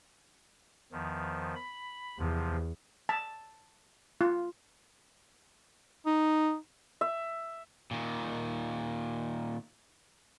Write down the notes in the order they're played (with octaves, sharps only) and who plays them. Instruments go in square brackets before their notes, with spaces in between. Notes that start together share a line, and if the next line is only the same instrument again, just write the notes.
[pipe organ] E2 D#3 F3
B5
[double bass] E2 [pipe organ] C3 F3
[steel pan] A5
F4
[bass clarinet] D#4
[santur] E5
[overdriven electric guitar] A#2 D#3